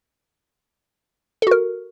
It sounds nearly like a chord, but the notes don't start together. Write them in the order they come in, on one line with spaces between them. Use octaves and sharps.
A4 F#4 A#4